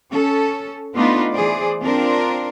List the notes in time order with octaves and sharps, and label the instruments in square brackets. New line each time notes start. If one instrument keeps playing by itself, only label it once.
[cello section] C#4 A4
A3 B3 D4 D#4 F4 B4
E3 G#4 C5 D5
C4 D4 F4 A#4